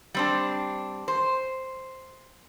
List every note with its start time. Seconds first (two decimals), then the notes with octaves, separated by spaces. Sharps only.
0.14 G3 C4 D4
1.08 C5